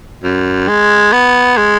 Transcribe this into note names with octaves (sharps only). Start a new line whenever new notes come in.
F#2
G#3
B3
G#3